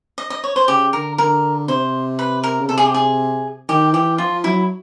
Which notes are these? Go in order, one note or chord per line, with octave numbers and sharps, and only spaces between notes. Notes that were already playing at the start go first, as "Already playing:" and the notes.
D#5
D#5
C#5
C5
C#3 G4
D3 A#4
D3 A#4
C3 C5
B4
A#4
C#3
C3 A4
G#4
G4
G#4
D#3 G4
E3 G4
F3 F4
F#3 E4